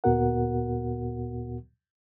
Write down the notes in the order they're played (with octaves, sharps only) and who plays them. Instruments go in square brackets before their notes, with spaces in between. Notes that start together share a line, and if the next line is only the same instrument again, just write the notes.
[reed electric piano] D2 A#2 B3 F#4 A#4 F#5